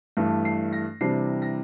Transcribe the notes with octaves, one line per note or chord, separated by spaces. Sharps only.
G2 E3 A3 D4
C7
A#6
C3 E3 G3 D4 C7
A#6